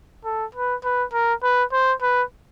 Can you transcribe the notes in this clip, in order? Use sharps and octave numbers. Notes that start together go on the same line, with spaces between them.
A4
B4
B4
A#4
B4
C5
B4